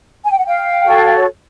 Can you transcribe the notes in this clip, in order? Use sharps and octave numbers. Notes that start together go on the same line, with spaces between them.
G#5
G5
F#5
F5 G5
F#4 A4 C#5